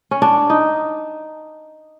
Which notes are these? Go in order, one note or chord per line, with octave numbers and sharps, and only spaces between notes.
C#4
D4
D#4